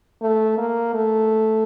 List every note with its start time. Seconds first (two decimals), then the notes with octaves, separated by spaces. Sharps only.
0.22 A3
0.58 A#3
0.94 A3